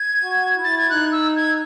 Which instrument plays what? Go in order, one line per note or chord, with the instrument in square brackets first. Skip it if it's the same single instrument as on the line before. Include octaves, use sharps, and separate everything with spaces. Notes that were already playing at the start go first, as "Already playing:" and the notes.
Already playing: [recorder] G#6
[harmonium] F#4
E4
[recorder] A6
G#6
[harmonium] D#4 [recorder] F#6
[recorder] E6
G#6